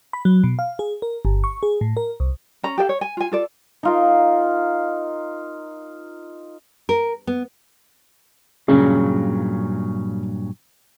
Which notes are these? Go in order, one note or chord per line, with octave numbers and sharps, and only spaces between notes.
B5
F#3
B2
F5
G#4
A#4
G1
C#6
G#4
A2
A#4
C2
C#4 A#5
G4 A4 D5 F5
C#5
G#5
F4 G#5
F4 A4 D5
D#4 F4 A#4
A#4
B3
G2 A#2 C#3 F#3